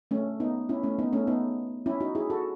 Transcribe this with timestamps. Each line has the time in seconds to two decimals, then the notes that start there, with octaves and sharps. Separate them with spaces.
0.11 A3 C#4
0.40 B3 D#4
0.69 C#4 E4
0.83 A3 C#4
0.99 B3 D#4
1.13 A3 C#4
1.27 B3 D#4
1.86 C#4 E4
2.00 D#4 F#4
2.15 E4 G#4
2.30 F#4 A4